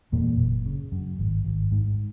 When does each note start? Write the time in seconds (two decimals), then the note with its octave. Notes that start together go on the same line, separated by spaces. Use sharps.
0.12 E2 A#2 A#3
0.40 F#1
0.66 C#3
0.92 F#2
1.19 G#1
1.45 G#1
1.72 G#2